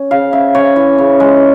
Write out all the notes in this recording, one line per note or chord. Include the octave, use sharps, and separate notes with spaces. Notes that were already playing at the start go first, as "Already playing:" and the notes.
Already playing: C#4
C#3 F5
C#3 E5
C#3 C#5
E3
C#3
G#3